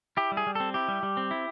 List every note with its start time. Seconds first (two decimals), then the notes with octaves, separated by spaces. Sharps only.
0.17 E4 G4
0.32 G3
0.37 G#4
0.47 G3
0.55 C4 A4
0.74 E4 G4
0.88 G3
1.03 G3
1.17 C4
1.31 E4